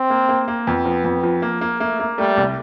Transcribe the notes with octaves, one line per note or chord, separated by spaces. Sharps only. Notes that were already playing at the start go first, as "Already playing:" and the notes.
Already playing: C4
A#3
A#3
A#3
F2 B3
F3
F2
F3
A#3
A#3
A3 A#3
A#3
G3 A3
C2